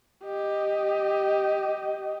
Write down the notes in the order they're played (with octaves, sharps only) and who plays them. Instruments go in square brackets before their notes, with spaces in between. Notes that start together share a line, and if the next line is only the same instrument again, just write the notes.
[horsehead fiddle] G4 D#5